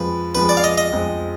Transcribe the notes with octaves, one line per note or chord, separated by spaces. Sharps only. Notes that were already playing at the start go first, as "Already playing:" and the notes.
Already playing: F2 F3 G#3 B4
F2 F3 G#3 B4
D5
F5
D#5
D#5
F2 F3 G#3